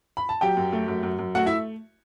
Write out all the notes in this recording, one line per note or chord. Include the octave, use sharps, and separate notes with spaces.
B5
A5
F#3 G4 G5
F#2
A3
F#2
F#2
F#2
A3 F#4 F#5
E4 E5